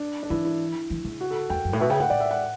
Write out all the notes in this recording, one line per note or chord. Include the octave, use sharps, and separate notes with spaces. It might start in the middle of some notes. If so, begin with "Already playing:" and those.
Already playing: D4
D4
E3 E4
E4
E3
C#3
F#4
A4
E2 G5
F#2
A2
B2 E5
C#3 G5
A2 F#5
A2 D5
E5
F#5